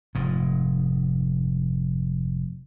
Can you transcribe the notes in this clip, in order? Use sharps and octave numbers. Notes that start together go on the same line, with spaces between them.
F1 G#2